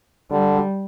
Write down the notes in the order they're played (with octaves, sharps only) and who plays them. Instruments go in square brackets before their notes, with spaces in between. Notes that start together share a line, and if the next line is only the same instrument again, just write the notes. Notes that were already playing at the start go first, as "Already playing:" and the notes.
[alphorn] D3 [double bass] G3